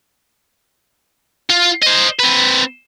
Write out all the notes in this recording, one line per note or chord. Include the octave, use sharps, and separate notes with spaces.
F4
C5 D#5
C4 B4